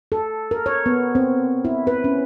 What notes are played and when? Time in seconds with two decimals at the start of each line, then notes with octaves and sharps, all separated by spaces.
0.12 A4
0.51 A#4
0.66 C#5
0.86 B3
1.15 C4
1.65 E4
1.87 B4
2.04 C#4